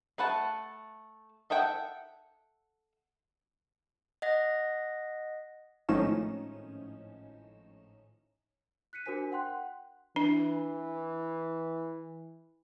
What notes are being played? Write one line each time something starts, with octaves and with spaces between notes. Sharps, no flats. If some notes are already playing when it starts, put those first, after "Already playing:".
A3 B4 F#5 A5
A4 E5 F#5 G5
D#5 F#5 A#6
G#1 A2 F3 C#4 D#4 E7
F#6 B6 C#7 D#7
D4 F#4 A#4 C5 G#5 B6
F#5 G5 C6 F#6
E3 D4